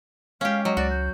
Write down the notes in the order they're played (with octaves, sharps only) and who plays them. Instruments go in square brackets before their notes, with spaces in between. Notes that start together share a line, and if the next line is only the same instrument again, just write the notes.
[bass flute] G#3 [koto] C#4 G4 [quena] F5
[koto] F#3 [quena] D#5
[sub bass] C#2 [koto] F#4 [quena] D5
[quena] G6